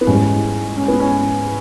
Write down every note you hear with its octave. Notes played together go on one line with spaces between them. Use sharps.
B3
G#2 E3 G3 C#4
C#4
B3
C#4